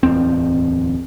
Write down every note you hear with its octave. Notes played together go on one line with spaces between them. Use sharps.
D1 E2 C4